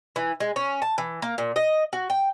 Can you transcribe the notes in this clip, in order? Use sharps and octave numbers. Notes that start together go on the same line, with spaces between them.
E3
G#3
C#4
A5
E3
A#3
A#2
D#5
F#4
G5